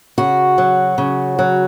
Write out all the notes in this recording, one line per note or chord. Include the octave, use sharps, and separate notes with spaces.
C#3 F#4
F#3
C#3
F#3